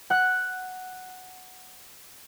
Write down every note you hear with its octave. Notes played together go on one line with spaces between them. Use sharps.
F#5 F#6